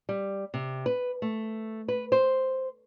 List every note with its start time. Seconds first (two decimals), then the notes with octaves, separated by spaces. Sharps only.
0.09 G3
0.54 C3
0.86 B4
1.22 A3
1.88 B4
2.12 C5